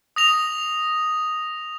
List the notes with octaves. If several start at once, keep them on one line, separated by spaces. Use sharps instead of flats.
D#6 A#6 F7